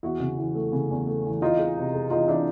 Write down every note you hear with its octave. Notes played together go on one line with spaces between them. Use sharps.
E2 E4 F#4
C#3
E3
A3
C#3
E2
A3
E3
E3 D#4 F4
G#3
C3
G#3
E3 D#4 F4
E3 D4 E4